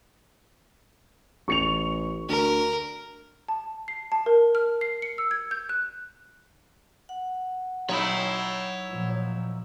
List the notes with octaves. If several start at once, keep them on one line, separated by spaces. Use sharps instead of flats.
A1 C#6 C#7 F7
D2 A#4
A5
C7
A5
A#4
F6
C7
C#7
E6
G#6
G6
F#6
F#5
F#3 D#4 E4 C#5 B5
A#2 F3